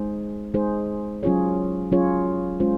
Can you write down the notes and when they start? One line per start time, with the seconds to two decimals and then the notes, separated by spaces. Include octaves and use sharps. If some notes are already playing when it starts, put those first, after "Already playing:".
Already playing: G#3 D#4 G#4 C5
0.54 G#3 D#4 G#4 C5
1.23 F#3 C#4 F4 G#4 C#5
1.91 F#3 C#4 F4 G#4 C#5
2.60 G#3 C#4 F4 C5